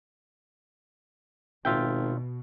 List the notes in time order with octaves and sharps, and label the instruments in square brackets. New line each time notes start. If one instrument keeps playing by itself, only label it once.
[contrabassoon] G#1 [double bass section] B2 [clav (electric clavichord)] F4 E5 G5